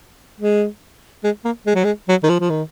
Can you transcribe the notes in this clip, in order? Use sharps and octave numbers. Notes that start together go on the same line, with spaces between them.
G#3
G#3
A#3
G#3
F#3
G#3
F#3
D#3
F3
F3
D#3